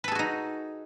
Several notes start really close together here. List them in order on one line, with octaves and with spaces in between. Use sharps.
B4 A4 G#4 F#4 D#4